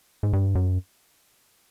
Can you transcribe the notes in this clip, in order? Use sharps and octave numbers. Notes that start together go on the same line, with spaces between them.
G#2
G2
F#2